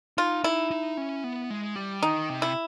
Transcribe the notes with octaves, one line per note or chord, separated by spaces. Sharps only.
D#4 F4
D#4 E4
D#4
C#4
B3
G#3
G3
D#3 D#4
C3
E4